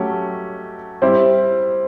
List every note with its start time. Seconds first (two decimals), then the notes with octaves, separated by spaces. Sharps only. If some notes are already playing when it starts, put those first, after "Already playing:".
Already playing: F#3 A3 C#4 G4
1.02 G3 C4 E4 G4